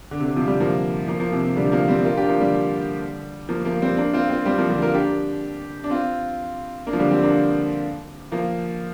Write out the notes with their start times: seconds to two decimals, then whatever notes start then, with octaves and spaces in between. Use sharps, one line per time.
0.11 D3
0.20 C3
0.24 D3
0.36 C3 F3
0.47 D3 G3
0.60 F3 A#3
1.08 F3 A#3
1.20 F3 A#3
1.32 C3 F3
1.44 C3
1.56 D3 G3
1.72 F3 A#3
1.88 G3 C4
2.05 F4 A#4
2.17 D4 G4
2.28 F3 A#3
2.41 D3 G3
3.49 F3 A#3
3.65 F3 A#3
3.81 G3 C4
3.97 A#3 D4
4.13 C4 F4
4.29 C4 F4
4.45 G3 C4
4.58 F3 A#3
4.69 D3 G3
4.82 F4 A#4
4.94 D4 G4
5.84 D4
5.90 C4 F4
6.87 A#3 D4
6.93 F3
6.99 D3 G3
7.11 G3 C4
7.23 A#3 D4
8.32 F3 A#3